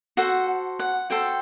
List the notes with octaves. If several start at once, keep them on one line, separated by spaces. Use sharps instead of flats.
F#4 A4 C5 F#5
F#5
F#4 A4 C5 G5